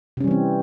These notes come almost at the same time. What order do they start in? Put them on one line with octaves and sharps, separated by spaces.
C3 C#4 G3 E3 C4